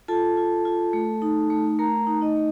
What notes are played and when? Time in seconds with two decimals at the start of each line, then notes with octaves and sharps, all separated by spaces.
0.08 F4 A4 A5
0.37 F4
0.65 F4
0.93 A3
1.22 D#4
1.50 A3
1.79 A3 A#4 A#5
2.07 D#4
2.21 D#4 D#5
2.36 A3